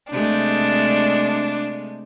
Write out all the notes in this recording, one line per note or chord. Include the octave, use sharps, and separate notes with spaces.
C3 G#3 A3 D4